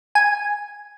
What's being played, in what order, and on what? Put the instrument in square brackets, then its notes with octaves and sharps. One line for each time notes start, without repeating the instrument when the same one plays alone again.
[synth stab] G#5